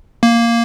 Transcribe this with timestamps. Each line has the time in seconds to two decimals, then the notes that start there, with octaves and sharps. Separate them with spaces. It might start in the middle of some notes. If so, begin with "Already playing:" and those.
0.23 A#3